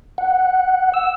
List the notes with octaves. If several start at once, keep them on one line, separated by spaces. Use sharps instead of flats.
F#5
E6